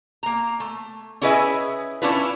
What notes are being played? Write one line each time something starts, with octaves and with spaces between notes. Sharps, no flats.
A#3 A#5
A3
C#4 E4 G#4 B4 D#5 E5
C#4 D4 E4 F4 B4